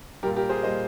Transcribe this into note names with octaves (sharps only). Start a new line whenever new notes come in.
A#2 G3 G4 A#4
G4 A#4
G#4 C5
A#2 G3 C5 D#5